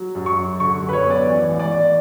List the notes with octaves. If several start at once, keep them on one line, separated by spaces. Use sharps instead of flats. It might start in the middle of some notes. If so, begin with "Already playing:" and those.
Already playing: F#3
F#2
C#6
F#3
D3 C#6
F#2
B4
C#5
B3
D5
E3
A1
D5
A1